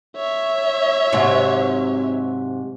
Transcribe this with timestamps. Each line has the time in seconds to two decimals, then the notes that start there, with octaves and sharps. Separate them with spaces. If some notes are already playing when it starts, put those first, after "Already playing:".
0.16 C#5 E5
1.12 G#2 C3 F#3